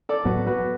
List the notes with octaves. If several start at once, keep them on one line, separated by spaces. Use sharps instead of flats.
A4 D5
A2 F#3 B3 F#4 B4
F#4 B4